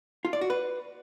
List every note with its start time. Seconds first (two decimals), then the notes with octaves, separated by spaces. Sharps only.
0.25 F4
0.33 D5
0.41 F#4
0.50 B4